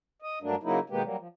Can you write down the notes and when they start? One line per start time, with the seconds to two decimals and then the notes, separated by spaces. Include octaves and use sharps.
0.22 D#5
0.42 G2 F#3 A3 A#3 D4
0.63 C#3 F#3 A#3 D#4 E4
0.90 B2 D#3 G#3 A#3 B3 G4
1.03 F#3 G3 A#3
1.18 F3